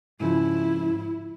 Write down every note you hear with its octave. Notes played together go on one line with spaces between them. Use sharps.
G#2 C#3 F3 E4